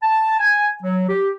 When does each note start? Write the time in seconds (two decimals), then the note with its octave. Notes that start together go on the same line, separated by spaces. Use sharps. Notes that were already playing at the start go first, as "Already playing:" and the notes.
0.03 A5
0.40 G#5
0.83 F#3
1.09 G4